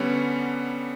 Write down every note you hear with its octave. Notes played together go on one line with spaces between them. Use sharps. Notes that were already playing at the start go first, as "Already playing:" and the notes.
Already playing: D3 G3 B3 C#4